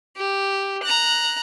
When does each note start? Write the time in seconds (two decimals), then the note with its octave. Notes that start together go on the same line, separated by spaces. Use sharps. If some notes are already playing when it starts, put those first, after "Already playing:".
0.17 G4
0.83 A#5 F#6